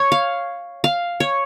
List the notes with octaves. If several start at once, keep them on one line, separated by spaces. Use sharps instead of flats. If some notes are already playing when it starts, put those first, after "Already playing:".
Already playing: C#5
F5
F5
C#5